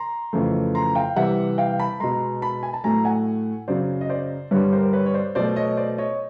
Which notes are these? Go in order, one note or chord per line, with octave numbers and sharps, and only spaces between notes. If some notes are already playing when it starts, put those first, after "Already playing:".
Already playing: A#5 C6
F2 C#3 E3 A3
A#5 C6
F5 G5
C3 E3 G3 E5 F#5
F5 G5
A5 B5
B2 G#3 A#5 C6
A5 B5
G#5
A5
A2 F#3 A3 G#5 A#5
F#5 G#5
F#2 C#3 F#3 C5 D5
D#5
C5 D5
G2 D3 G3 B4 C#5
A#4 C5
C5
B4 C#5
C#5
C5 D5
B2 F#3 A3 C5 D5
C#5 D#5
C5 D5
C#5 D#5